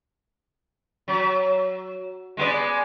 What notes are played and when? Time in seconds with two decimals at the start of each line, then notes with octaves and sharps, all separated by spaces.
1.08 F#3
2.37 G#3 B3 D5